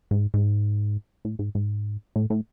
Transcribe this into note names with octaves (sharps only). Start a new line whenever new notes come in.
G#2
G#2
A2
G#2
G#2
A2
A2